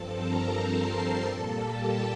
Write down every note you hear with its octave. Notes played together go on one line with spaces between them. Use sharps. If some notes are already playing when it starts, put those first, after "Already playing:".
Already playing: G2 F3 C4 A4 A5
A#4 A#5
C5 C6
A#4 A#5
A#2 G3 A#3 A4 A5
G4 G5